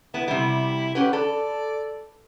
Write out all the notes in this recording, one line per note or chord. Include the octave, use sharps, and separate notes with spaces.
B3 E4
C3 G3 E4
C#4 G4 B4 F#5
A4 D5